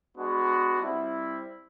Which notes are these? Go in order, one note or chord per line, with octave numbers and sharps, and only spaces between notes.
G#3 B3 D4 F#4
G3 C4 E4